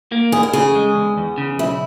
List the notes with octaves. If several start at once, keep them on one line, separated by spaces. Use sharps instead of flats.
A#3
E2 G#4
A#4
C#3 G#4
G#3
E2
E2
C#3
B1 E4